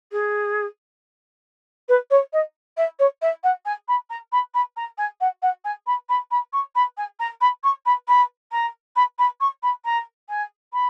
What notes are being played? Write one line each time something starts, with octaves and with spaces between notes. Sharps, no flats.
G#4
B4
C#5
D#5
E5
C#5
E5
F#5
G#5
B5
A#5
B5
B5
A#5
G#5
F#5
F#5
G#5
B5
B5
B5
C#6
B5
G#5
A#5
B5
C#6
B5
B5
A#5
B5
B5
C#6
B5
A#5
G#5
B5